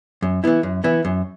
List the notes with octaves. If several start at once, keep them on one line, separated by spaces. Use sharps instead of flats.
F#2
E3 B3 E4
F#2
E3 B3 E4
F#2